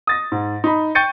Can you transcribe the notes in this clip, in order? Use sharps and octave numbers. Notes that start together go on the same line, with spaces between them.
D#6 A6 A#6
G#2
D#4 B5
G5 C#6 G6 A6 C#7 D#7